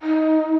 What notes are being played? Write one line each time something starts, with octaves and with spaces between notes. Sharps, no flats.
D#4